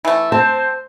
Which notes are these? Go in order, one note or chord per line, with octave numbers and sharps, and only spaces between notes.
E3 A3
C4 C5 A5